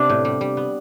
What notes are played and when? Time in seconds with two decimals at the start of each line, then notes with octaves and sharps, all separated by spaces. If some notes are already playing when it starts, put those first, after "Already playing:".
Already playing: C3 B3 D4
0.09 A2
0.25 G3
0.41 G3
0.57 B3